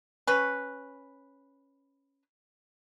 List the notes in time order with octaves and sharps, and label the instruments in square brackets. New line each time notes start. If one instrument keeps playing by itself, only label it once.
[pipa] C#4 B4